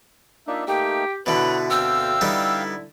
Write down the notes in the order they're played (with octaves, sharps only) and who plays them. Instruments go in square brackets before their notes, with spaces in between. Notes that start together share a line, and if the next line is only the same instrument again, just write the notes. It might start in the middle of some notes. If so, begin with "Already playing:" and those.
[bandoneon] A#3 D4 D#4 [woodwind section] F4 D5 E5
[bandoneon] A3 A#3 D#4 [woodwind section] G4 [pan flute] G5
[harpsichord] B2 D3 [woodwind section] E4 B4 [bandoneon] C#5 [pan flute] B5
[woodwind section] D2 C4 [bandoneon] E5 F5 G5 [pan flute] E6
[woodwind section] D3 E4 [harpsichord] G3 B3 D#4